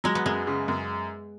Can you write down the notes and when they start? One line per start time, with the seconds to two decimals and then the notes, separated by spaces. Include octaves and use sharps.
0.04 F#3 G#3
0.15 B3
0.26 F#2 G#3
0.47 C#3
0.68 F#2